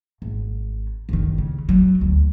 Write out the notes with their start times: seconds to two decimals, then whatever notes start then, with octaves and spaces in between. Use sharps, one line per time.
0.22 G#1
1.09 G1 D#3
1.38 C#3
1.69 F#3
2.01 D2